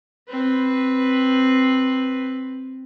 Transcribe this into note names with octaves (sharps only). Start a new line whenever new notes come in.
C4 B4